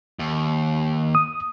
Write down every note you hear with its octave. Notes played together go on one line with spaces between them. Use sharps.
D#2
D#6